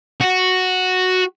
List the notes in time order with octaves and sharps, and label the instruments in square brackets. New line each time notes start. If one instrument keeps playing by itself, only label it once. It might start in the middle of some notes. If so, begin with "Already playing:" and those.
[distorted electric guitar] F#4